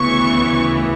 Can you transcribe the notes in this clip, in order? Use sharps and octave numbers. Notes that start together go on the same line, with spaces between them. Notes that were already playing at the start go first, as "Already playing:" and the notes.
Already playing: D2 C#3 E3 B3 C#6